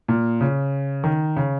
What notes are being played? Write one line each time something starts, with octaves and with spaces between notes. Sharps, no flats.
A#2
C#3
D#3
C#3